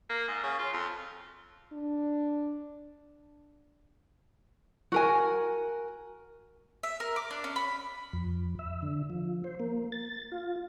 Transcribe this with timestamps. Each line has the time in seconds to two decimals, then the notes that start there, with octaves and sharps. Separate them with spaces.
0.10 A#3
0.28 G#2
0.43 C#3
0.59 F4
0.73 F2
1.73 D4
4.92 F#4 A#4 G#5
6.83 E5
7.00 A#4
7.16 D6
7.31 D4
7.44 C#4
7.56 B5
8.13 F2
8.59 E5
8.82 D3
9.10 F3
9.44 C5
9.60 A#3
9.92 A6
10.32 F4